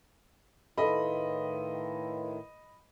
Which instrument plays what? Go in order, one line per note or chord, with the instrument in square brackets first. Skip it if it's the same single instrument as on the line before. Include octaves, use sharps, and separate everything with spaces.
[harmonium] A2 D#3 [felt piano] A4 [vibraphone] B4 F5 C6 [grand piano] D#5 B5